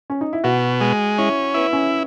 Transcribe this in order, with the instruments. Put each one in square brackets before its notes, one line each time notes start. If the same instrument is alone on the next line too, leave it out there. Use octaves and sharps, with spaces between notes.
[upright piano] C#4
D#4
E4
[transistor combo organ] B2 [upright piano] F#4
[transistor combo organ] G#3
[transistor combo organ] C#4 [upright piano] E4
[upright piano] B3 [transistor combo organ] E4
[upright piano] C#4